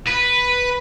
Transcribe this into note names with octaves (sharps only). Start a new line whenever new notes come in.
B4